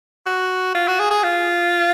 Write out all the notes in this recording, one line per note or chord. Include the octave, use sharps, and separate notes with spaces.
F#4
F4
F#4
G#4
G#4
F4